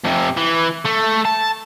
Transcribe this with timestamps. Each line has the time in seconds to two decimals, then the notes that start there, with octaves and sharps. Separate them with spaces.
0.04 F2 C3
0.37 E3
0.86 A3
1.26 A5